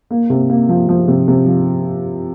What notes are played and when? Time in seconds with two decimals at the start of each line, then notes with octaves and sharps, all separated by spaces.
0.11 A#3
0.30 C3
0.50 A#3
0.69 F3
0.89 F3
1.08 C3
1.28 C3
1.47 F3